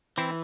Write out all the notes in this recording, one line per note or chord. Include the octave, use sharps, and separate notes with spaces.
E3 C4 E4